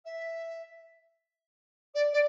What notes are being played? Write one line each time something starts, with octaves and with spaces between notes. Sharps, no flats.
E5
D5
D5